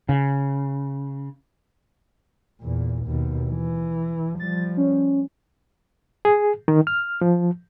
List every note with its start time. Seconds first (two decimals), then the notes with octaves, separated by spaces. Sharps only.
0.09 C#3
2.61 E2 A#2
3.05 D#2 B2
3.50 E3
4.40 F3 G3 A6
4.77 C#4
6.25 G#4
6.68 D#3
6.87 F6
7.21 F3